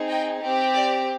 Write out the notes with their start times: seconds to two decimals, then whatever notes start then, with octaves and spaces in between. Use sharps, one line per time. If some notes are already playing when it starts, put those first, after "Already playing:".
Already playing: C4 D#4 G#4
0.09 D#5 G5
0.41 C4 G4
0.75 D5